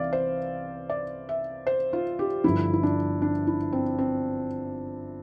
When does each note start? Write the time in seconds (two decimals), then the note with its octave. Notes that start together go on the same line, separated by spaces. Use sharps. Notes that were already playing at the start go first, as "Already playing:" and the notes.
Already playing: C2 C3 E3 D5 E5 F5
0.13 C5
0.90 D5
1.29 E5
1.67 C5
1.93 F4
2.19 G4
2.44 G1 G2 D3 F3 E4
2.73 E4
2.83 D4
3.22 D4
3.47 E4
3.73 C4
3.98 C4